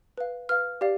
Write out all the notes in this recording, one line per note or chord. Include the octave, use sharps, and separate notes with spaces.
B4 F5
B4 F5 F6
G4 D5 F5